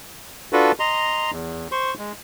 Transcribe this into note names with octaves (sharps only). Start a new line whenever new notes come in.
D4 F4 F#4 A4 B4
D#5 A#5 C6
E2
C5 C6 C#6
G#3